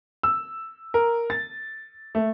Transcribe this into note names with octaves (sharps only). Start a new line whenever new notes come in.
E6
A#4
A6
A3